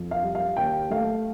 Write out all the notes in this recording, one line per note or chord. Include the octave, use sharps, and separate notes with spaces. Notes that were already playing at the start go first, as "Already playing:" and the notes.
Already playing: F2
F5
G3
F5
D#2 G5
A3 F5